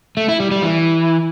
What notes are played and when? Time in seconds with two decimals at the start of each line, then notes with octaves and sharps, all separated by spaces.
0.17 A3
0.28 E4
0.40 G3
0.51 G3
0.63 E3